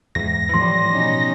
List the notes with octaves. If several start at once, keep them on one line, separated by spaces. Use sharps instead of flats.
E2 G#2 A#6
A2 E3 F3 G3 A3 C6
B2 C#4 D#4